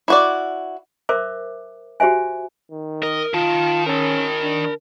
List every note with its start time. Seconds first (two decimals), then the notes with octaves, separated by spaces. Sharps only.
0.08 E4 F#4 D5
1.09 A#4 C5 E5 D6
2.00 F#4 G4 C5 E5 G#5
2.71 D#3
3.03 A#4 D#5
3.34 D#3 F4 A5
3.86 C#4 A#4 A5
4.42 D4